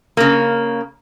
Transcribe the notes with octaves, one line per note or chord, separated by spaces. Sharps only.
C#3 A#3